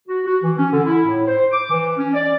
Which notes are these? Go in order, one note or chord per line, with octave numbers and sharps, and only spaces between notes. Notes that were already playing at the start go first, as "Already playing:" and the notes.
F#4
F#4
E3
C#4
D3
E4
A2
C5
D6
E3
C#4
D5